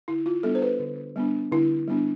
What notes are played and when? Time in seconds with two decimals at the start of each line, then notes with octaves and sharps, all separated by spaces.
0.08 D3 E4
0.26 F4
0.43 G3 B3 D4 A4
0.55 C5
0.62 B4
0.80 D3
1.16 G3 B3 D4
1.52 D3 E4
1.88 G3 B3 D4